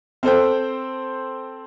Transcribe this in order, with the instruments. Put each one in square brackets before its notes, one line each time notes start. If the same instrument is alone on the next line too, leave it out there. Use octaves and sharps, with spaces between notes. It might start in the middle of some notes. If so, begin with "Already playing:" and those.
[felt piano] C4 A4 C5 G5